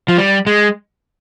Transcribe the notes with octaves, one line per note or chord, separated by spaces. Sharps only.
F3
G3
G#3